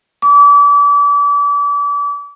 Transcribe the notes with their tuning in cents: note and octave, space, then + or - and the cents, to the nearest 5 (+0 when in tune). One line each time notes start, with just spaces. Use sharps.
D6 -35